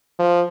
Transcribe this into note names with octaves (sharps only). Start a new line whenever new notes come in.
F3